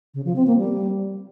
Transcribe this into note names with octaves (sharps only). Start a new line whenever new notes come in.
C#3
F3
C4
A#3
G3